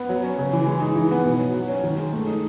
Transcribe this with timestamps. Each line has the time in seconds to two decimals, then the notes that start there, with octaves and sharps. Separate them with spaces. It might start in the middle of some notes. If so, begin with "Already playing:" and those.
Already playing: B3
0.09 F#3
0.23 C#4
0.38 C#3
0.53 E3
0.67 G#3
0.81 D#4
0.96 E3
1.11 B3
1.26 B2
1.39 F#3
1.54 F#3
1.69 C#4
1.84 D#3
1.97 G#3
2.13 A3
2.27 D#4